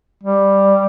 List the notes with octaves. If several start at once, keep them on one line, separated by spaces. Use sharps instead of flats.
G3